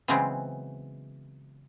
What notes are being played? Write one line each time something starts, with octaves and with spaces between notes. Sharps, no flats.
C#3 E3 F#3 G#3 B3 C4